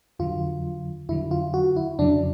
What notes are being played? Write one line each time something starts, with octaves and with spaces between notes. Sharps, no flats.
F2 D3 F#3 F4
F2 D3 F#3 E4
F4
F#4
E4
F2 C#3 F#3 D4